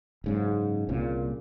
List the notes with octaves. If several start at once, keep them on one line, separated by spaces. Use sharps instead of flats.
F#1 G#2 C#3
C2 A#2 C#3